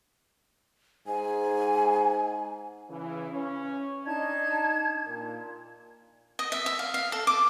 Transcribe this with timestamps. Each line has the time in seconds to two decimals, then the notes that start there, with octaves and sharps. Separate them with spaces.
1.07 G#2 G#5
2.89 C#3 E3
3.31 C#4
4.06 D4 D#4 D5 A5 G#6
5.06 A#2
6.39 D#5
6.52 E5
6.66 E5
6.79 F5
6.94 F5
7.12 A4
7.27 D6